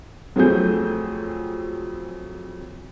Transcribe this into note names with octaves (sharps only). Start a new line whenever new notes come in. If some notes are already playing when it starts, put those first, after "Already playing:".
F2 F#3 A3 C4 G#4 G6